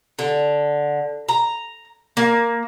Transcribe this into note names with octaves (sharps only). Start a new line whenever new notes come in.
D3
A#5
A#3